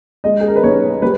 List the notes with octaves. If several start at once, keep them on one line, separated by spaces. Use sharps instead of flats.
G#3 D#5
G#4
A#4
B4
B1 C#5
G3 B4